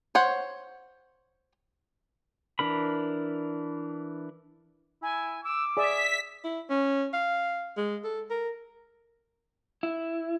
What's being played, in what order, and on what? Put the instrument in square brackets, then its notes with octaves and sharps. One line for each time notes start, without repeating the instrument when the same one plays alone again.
[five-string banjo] C5 C#5 F#5
[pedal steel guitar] E3 D4 A#4 B5
[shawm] E4 [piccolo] G#5
[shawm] D6 [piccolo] E6
[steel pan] G#4 D5 [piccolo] E5 [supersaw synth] B6
[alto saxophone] E4
C#4
F5
G#3
A4
A#4
[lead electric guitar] E4